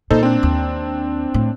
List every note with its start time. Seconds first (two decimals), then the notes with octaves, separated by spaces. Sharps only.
0.11 A#2 D#4 A4 C5
0.23 C4 D4
0.43 D#2
1.34 A2